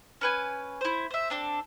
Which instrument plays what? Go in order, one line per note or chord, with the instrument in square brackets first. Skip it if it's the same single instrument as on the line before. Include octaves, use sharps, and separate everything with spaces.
[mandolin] C#4 B4 G#5
E4 C5
C5 E5
C4 D4 A4